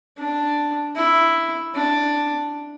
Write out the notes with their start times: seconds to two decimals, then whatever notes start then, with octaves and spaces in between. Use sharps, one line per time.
0.18 D4
0.96 E4
1.74 D4